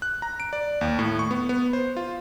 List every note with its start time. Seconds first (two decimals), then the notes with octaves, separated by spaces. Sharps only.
0.02 F#6
0.22 A#5
0.40 D7
0.53 D5
0.81 D#2
0.99 A2
1.19 C#6
1.31 B3
1.49 B3
1.73 C5
1.97 F4